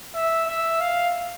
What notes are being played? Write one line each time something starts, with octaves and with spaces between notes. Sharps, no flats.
E5
E5
F5